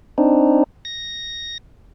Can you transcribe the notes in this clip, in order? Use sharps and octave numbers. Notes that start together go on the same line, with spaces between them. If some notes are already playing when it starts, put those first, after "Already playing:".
C4 D4 D#4
A#6